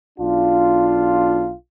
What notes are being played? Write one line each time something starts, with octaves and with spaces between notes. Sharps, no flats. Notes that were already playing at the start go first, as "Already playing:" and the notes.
B1 D4 F4